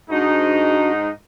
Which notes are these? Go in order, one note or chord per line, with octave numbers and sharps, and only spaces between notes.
G#2 D4 D#4 F#4